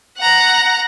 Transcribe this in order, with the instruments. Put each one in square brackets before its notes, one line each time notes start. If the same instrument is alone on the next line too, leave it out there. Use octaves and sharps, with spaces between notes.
[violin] F#5 A#5